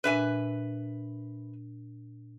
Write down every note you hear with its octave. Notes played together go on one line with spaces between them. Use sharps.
A#2 D4 B4 E5 G#5